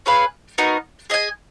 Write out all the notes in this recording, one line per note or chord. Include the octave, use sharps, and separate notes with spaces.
C#4 G#4 B4 F5
B3 D#4 F#4 A#4
G#4 D#5 G#5